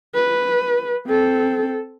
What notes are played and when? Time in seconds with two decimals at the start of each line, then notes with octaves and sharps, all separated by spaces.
0.15 B4
1.07 C4 A4